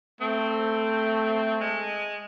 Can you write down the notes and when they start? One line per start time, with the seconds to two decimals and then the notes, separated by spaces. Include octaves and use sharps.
0.21 A3 C4
1.61 G#3